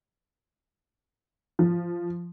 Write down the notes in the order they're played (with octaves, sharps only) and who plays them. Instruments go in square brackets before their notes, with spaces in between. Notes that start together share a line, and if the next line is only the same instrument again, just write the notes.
[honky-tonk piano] F3